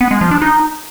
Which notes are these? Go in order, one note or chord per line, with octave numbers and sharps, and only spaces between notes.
B3
G#3
F3
D4
D#4